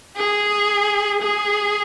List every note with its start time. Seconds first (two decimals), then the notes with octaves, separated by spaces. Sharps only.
0.16 G#4
1.22 G#4